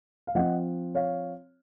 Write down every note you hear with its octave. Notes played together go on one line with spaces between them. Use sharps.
F5
F3 C4 D#5 F#5
C#5 F5